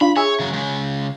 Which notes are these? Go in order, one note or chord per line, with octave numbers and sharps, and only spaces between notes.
D4 F4 B5
G#4 C#5 E5
C#3 F#3
C#3 G#3